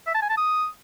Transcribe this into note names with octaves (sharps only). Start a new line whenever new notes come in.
E5
A5
G#5
A5
D#6